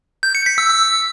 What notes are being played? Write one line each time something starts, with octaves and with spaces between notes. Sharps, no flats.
G6
C#7
B6
E6
E6